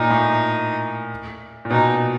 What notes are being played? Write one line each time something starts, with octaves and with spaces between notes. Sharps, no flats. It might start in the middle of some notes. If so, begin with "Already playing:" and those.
Already playing: A#2 D#4
A2
A#2
B2 D#4